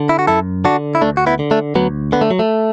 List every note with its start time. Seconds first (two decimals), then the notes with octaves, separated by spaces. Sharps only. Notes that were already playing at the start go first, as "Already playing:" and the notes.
Already playing: D3
0.09 E4
0.19 F#4
0.27 F#2 E4 A4
0.64 D3 D4 F#4
0.95 E4
1.02 D2 A3 D4
1.17 F#4
1.26 B3 E4
1.39 D3
1.51 A3 D4
1.75 D2 F#3 B3
2.12 D3 B3
2.21 A3
2.31 F#3
2.39 A3